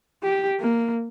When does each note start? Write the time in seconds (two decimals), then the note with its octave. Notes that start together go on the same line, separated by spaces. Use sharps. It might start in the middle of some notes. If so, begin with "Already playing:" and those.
0.23 G4
0.60 A#3